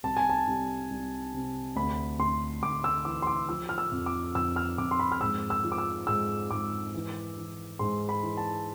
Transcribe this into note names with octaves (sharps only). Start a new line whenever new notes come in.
C2 A5
G#5
A5
C2
C2
C3
D2 B5
D2 C6
D2 D6
E6
E3 D6
C6
D6
F3 E6
F6
E6
F2
D6
F2 E6
F6
F2 D6
C6
B5
F6
G#2 E6
E6
F3
D6
E6
G#2 E6
G#2 D6
E3
E3
G#2 C6
B5
E3
A5